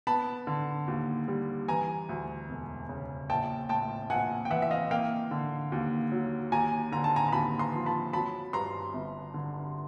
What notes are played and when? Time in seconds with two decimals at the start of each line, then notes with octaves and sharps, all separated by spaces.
0.07 B3 A5 B5
0.47 D3
0.88 D#2
1.28 G3
1.68 E3 G#5 A#5
2.09 D2
2.49 E1
2.89 C#3
3.30 A#1 G5 A5
3.69 A2 G5 A5
4.10 A#1 F#5 G#5
4.45 G5
4.50 E3 E5 F#5
4.62 E5
4.71 D#5 F5
4.91 A#3 F5 G5
5.31 D3
5.72 D#2
6.12 F#3
6.52 D#2 G#5 A#5
6.92 D3 A#5
7.04 A5
7.16 G#5 A#5
7.28 A#5
7.32 D#2 A5 B5
7.59 A#5 C6
7.73 F3
7.86 A5 B5
8.13 F#3 A5 B5
8.53 G2 A#5 C6
8.93 G1
9.34 D3